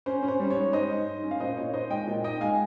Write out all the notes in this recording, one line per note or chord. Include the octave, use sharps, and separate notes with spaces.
C#4 C5
C#4
C5
G3
C#5
G#2
G#2 C5 D#5
G#2
G#2
C#4
F5
A#2 C5 D#5
A#2 C#5
D#4 C5 D#5
G#3 D#5 G5
A#2
D#4 D#5 G5
G#3 F5 G#5